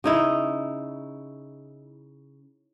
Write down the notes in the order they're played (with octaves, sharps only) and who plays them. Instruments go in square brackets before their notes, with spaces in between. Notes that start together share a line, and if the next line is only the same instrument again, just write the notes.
[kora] C#3 D#4 E4